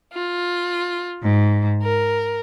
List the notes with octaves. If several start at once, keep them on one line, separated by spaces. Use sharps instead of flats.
F4
G#2
A#4